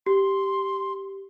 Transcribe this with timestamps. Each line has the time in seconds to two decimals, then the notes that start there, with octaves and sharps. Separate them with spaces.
0.06 G4 C6